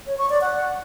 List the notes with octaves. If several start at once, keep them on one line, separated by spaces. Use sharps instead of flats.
C#5
C#6
D5
F#5